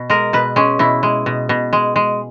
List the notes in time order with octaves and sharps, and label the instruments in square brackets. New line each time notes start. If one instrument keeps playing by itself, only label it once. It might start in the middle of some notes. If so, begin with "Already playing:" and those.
Already playing: [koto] B2
G#3 A#4
B2 B4
G#3 C#4
B2 E4
G#3
B2
B2
G#3
G#3